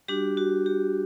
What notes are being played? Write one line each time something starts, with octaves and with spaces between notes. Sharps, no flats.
G3 D4 F#4 G4
F#4
G4